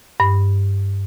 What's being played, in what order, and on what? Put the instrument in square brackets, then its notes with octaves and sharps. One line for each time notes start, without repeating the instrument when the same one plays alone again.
[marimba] G2